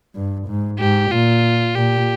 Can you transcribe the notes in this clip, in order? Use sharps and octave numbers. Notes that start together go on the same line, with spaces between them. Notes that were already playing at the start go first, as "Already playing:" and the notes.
G2
G#2
G#2 G4
A#2 F4
A#2 G4